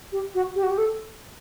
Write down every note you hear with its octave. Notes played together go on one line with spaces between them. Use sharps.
G4
F#4
G4
F#4
G4
A4